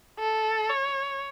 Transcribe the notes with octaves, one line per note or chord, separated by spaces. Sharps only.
A4
C#5